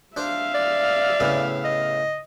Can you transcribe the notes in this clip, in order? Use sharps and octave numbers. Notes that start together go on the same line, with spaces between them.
D4 C5 E5 F5
D5
A2 C#3 B3
D#5